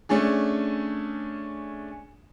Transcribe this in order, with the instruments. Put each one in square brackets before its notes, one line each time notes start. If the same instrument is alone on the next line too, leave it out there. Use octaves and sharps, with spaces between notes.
[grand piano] A3 C#4 D4 G#4